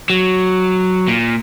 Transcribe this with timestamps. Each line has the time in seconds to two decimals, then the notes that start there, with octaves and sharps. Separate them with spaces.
0.10 F#3
1.08 A#2